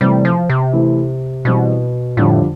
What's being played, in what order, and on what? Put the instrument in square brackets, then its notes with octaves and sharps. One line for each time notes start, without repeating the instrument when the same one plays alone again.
[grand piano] C3 E3 A3 [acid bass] G3
[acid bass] F3
C3
[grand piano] E3 A3 E4
[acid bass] B2 [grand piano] E3 G3 C4 E4
[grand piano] F2 D3 G3 D4 F4 [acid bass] A2